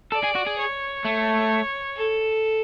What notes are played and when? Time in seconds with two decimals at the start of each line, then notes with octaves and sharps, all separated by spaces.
0.12 A4 D5
0.24 G#4
0.35 F#4
0.46 G#4
0.58 C#5
1.05 A3
1.97 A4